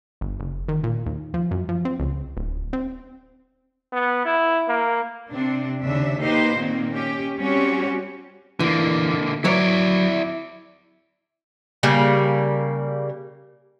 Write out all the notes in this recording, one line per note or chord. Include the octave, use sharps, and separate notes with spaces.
G1
F#1
D#3
A#2
D#2
F3
F#2
F3
C4
C#2
D1
C4
B3
E4
A#3
C3 C4 D4
D#2 C#3 D4 E5
A#3 D#4 G4 B4 C5
A#2 D#3 A#3 C4
C#4 G4
G3 C4 C#4 F#4 G4 C#5
D3 E3 A#3
F#3 E4 B4 C#5 D5
C#3 G3 A#3